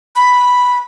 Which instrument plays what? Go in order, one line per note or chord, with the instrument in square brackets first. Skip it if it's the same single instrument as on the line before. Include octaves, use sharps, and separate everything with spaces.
[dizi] B5